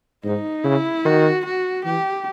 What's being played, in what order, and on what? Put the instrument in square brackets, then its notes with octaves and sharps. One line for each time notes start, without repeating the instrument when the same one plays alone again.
[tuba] G#2 [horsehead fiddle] D#4
[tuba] C#3 [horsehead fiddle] E4
[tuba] D#3 [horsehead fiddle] F#4
[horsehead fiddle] F#4
[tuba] E3 [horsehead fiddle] G4